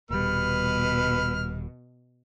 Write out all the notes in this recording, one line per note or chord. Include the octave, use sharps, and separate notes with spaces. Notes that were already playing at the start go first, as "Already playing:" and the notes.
D#1 B2 G3 B4 F6